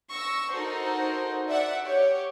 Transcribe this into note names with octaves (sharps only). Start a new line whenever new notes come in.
C#6 E6 A#6
D#4 F#4 A4 A#4 C5
D5 E5 F#5
G4 C#5